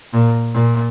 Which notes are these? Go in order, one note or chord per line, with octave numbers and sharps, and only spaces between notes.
A#2
A#2